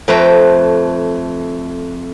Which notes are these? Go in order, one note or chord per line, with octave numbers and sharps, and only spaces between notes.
F2 A3 B4 C5 G5 A#5